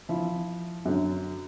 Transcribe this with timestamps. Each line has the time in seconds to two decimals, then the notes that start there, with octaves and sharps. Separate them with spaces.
0.09 F3 E4
0.85 F#2 D3